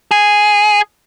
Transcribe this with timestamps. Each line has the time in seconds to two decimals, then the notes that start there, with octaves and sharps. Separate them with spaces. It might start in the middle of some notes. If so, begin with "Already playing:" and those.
0.11 G#4